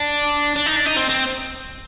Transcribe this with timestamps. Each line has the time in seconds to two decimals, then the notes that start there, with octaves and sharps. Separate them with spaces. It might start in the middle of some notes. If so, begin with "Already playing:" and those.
Already playing: D4
0.56 D4
0.66 D#4
0.76 D4
0.86 D#4
0.96 C4
1.09 C4